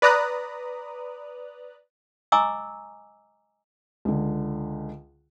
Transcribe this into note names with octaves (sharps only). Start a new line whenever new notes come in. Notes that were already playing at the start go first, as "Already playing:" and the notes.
B4 D5 A#5 D#6 F#6
D#5 G#5 A#5 C#6 D6 E6
C#2 D3